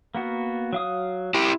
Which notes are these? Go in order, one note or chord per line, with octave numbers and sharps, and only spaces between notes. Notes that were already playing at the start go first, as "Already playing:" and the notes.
A#3 B3 F#4
F#3 F5 D#6
E4 G4